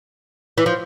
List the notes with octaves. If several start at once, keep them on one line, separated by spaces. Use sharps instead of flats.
E3
F3